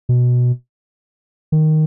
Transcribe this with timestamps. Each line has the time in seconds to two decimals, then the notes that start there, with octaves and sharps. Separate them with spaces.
0.09 B2
1.52 D#3